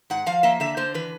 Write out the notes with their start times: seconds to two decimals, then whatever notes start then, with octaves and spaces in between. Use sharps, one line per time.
0.10 G#2 F#5
0.26 F3 F5
0.43 A#3 E5
0.60 D3 E5
0.77 D3 C5
0.94 E3 B4